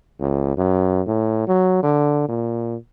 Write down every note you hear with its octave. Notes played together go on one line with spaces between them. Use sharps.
C#2
F#2
A2
F#3
D3
A#2